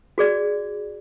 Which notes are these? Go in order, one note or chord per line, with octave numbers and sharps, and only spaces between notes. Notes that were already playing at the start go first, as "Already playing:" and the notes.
F#4 G#4 D5